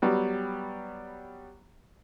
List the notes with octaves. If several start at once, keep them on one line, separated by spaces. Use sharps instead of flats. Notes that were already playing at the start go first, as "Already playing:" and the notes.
F#3 G3 B3